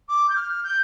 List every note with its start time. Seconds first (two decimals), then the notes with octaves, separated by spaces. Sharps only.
0.09 D6
0.29 G6
0.36 F6
0.64 G6